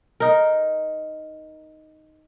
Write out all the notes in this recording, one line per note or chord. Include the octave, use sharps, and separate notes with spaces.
D#4 A#4